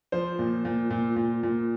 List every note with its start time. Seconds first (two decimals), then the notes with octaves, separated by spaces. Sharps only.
0.12 F3 C5
0.39 A#2
0.65 A#2
0.90 A#2
1.16 A#2
1.43 A#2